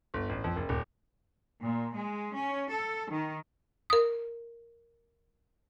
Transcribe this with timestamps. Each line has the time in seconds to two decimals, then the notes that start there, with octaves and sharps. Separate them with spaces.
0.14 G1
0.29 A1
0.44 F2
0.56 F#1
0.69 D#1
1.63 A#2
1.94 G#3
2.35 C#4
2.70 A4
3.10 D#3
3.90 A#4 D#6